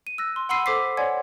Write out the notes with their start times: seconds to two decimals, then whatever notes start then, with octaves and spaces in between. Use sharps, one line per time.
0.07 D#7
0.18 E6 F#6 A#6
0.36 C6
0.49 F#5 B5 C6 E6 C7 D#7
0.66 A4 C5 D6 B6 C7
0.97 C#5 D5 F#5 G#5 C6 G#6